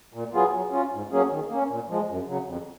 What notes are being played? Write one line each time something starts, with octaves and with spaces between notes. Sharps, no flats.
A#2
F#3 B3 F4 G#4
F#3
C#4 F4
G#2
F#3 A#3 C#4 G#4
D#3
A#3 C#4
A#2
F3 G#3
F#2
C#3 F#3
F2